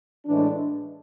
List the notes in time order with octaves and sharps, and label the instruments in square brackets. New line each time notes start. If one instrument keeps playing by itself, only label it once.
[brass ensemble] A2 E3 G#3 D4